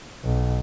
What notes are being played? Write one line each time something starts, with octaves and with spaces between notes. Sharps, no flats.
B1